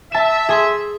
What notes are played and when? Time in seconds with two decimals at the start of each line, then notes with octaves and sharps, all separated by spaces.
0.12 E5 A5 E7
0.49 G#4 C6